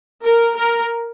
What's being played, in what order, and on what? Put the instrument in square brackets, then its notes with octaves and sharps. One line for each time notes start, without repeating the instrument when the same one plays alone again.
[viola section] A#4
A#4